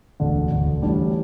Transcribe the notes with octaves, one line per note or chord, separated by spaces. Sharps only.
E1 D2 D3
E1 D2 D3
A1 A2 G3 D4